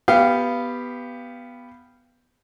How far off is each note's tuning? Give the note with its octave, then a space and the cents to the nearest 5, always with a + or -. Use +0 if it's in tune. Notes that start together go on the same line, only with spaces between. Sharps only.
B3 +0 G4 +0 F5 -20